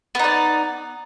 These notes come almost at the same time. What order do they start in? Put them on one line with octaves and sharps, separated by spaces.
B3 D#4 D5